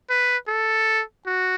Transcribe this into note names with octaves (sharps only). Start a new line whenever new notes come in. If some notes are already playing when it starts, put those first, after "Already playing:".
B4
A4
F#4